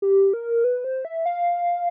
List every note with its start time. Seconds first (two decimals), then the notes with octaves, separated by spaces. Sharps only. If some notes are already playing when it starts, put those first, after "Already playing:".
0.02 G4
0.33 A#4
0.64 B4
0.84 C5
1.05 E5
1.26 F5